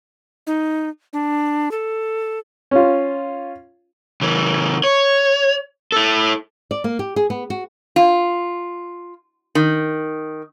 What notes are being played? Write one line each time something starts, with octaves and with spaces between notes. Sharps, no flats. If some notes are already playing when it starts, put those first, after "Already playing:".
D#4
D4
A4
C#4 F4
C#3 E3
C#5
E4 A4
D5
A#3
G4
G#4
B3
F#4
F4
D#3